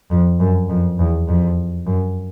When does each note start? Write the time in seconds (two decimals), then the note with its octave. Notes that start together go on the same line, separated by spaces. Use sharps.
0.11 F2
0.40 F#2
0.69 F2
0.99 E2
1.28 F2
1.86 F#2